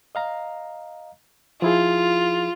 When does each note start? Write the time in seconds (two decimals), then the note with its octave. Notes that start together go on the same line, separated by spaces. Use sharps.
0.15 D#5 F5 A#5
1.62 F3 E4 F4 G#4